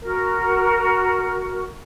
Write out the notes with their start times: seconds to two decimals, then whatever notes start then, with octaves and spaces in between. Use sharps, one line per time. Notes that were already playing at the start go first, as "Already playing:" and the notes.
0.01 F#4 A#4